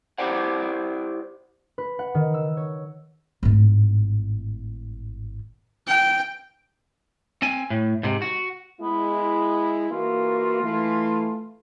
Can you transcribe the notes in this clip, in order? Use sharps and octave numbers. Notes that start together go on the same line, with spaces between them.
E4 G4 C5 D5 F#5
B4
F#5
D#3
E6
C#5
G#1 A2
G5
C4 G#5
A2
G#2 C3
F#4
G#3 B3 E4
E3 A#3 F4 F#4
E3 A3